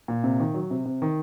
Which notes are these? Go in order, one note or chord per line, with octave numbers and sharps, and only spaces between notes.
A#2
C3
D#3
F#3
C3
C3
D#3